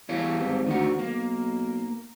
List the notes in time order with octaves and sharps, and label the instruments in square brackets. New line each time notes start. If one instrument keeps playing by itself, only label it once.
[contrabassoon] E2 [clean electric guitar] G3 C#5 F5
[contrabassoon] G#1
[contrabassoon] D2 [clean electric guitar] D#3 F#4
[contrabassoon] B1 [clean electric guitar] A#3